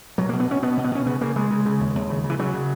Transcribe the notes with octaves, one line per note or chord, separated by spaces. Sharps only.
B2 F#3
B2 A#3
B3
B2 C#4
B2 B3
B2
B3
B2 C#4
C#3 B3
C#3 A#3
C#3 G#3
C#3
C#3
D#2
D#2
C#3
C#3
E3
C#3 F#3
C#3